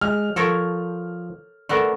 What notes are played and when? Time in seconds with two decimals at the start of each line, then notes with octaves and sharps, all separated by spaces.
0.01 G#3 F6
0.36 F3 A4 A#4 C#5
1.69 A3 B3 D4 A#4